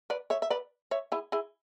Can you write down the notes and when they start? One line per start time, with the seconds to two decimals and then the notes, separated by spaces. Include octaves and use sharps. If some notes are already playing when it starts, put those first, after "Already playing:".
0.10 B4 D5
0.30 C#5 E5
0.42 E5
0.50 B4 D5
0.91 C#5 E5
1.12 E4 G#4
1.32 E4 G#4